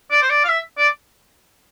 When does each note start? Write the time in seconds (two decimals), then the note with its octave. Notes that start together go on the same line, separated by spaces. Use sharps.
0.11 D5
0.22 C5
0.30 D5
0.44 F5
0.49 E5
0.77 D5